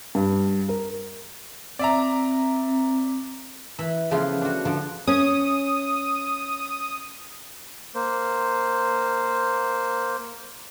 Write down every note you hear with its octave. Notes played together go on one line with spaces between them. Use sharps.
G2
A#4
C4 D5 E5 A#5
E3 E5 B5
C#3 F3 A3 B3 E4 F4
D4 F#4
D3 F3 D5 A5
C#4 D#6
A#3 C5